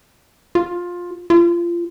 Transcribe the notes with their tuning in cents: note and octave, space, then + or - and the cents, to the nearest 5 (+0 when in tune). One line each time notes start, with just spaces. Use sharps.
F4 +15
F4 -25